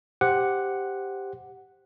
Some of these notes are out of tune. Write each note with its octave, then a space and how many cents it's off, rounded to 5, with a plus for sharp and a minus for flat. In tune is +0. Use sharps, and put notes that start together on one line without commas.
G4 +0 C5 +0 F#5 +0